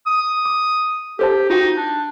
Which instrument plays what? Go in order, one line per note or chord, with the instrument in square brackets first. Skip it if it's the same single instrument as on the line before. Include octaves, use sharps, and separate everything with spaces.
[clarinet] D#6
[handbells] D6
[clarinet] G4 [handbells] A4 C5 A5
[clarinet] D#4 [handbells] F4 F#4 G5
[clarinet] D4